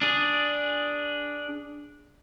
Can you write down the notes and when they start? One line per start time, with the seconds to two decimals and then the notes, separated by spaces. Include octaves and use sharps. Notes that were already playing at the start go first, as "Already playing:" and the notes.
0.01 D4 G#4